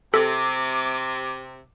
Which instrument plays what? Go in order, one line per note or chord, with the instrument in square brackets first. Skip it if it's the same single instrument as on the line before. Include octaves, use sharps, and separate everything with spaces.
[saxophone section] C3 [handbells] A4 [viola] D6